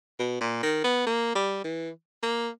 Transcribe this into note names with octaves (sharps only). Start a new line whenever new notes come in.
B2
A#2
D#3
B3
A#3
G3
E3
A#3